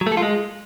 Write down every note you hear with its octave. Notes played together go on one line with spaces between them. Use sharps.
F#3
A3
A4
F4
G#3